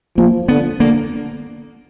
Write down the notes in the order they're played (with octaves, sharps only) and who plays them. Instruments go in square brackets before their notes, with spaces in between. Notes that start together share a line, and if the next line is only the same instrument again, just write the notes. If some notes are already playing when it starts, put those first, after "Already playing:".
[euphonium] F3 [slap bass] A#3
[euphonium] D3 [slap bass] B3
[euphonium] D3 [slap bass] A#3